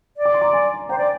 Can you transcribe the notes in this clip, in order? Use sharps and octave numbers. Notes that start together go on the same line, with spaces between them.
D5
D6
C6
A#5 D6
G#5 C6
C5 G5 A#5
D5